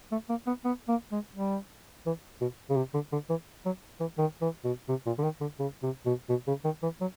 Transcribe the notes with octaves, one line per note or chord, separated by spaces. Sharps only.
A3
A#3
B3
B3
A#3
G#3
G3
E3
B2
C#3
C3
D3
D3
E3
F#3
E3
D#3
E3
B2
C3
A#2
D3
D#3
D3
C#3
C3
B2
B2
C#3
D#3
E3
F#3